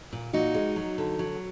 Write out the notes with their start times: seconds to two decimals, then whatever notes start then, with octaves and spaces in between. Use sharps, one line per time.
0.13 A#2
0.33 A#2 D#4 F#4
0.55 G#3
0.76 F#3
0.98 D3
1.19 F#3